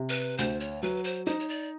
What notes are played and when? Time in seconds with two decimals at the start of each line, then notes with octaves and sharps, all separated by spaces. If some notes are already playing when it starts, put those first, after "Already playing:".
Already playing: C3
0.09 B4
0.38 D2 C5
0.60 C#5
0.83 F#3 B4
1.04 C5
1.26 D#4 C5
1.40 C#5
1.49 D5